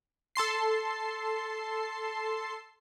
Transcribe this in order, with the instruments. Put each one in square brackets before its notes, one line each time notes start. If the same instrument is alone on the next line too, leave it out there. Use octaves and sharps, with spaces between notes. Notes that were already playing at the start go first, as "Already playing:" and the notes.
[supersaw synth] A4 A5 C6 C7